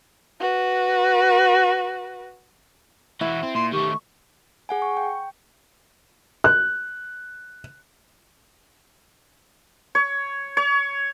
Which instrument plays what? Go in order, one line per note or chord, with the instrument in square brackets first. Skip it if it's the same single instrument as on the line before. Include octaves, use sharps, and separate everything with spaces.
[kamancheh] F#4 B4
[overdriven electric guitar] E3 F#4 [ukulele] E4
[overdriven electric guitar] C4
[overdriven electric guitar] A#2 [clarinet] C6
[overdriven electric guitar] D#3 A3 [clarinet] G4 [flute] C#6
[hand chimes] G#4 F#5 G#5
C#6
G5
[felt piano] F#6
[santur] C#5
C#5